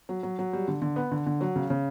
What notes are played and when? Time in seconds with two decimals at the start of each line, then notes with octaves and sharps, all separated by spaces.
0.09 F#3
0.23 F#3
0.39 F#3
0.53 G3
0.68 D3
0.82 D3
0.96 B3
1.12 D3
1.26 D3
1.41 F#3
1.56 C#3
1.70 C#3